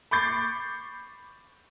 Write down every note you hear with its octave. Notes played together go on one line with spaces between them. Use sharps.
B5 C#6 D6 G6 A6 C7